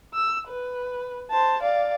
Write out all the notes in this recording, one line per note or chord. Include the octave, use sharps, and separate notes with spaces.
E6
B4
C5 A5
D5 F5